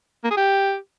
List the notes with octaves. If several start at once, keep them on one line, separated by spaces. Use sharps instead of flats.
A#3
G#4
G4